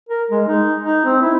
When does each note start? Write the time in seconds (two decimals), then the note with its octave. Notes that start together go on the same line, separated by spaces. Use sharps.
0.09 A#4
0.30 G#3
0.48 D#4
0.83 D#4
1.05 C4
1.22 E4